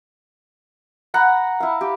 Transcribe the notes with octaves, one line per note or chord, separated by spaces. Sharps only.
F#5 A#5 B5
E4 F5
G4